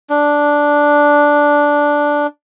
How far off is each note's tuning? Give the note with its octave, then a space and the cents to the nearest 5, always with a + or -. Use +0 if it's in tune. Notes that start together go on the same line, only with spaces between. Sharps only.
D4 -5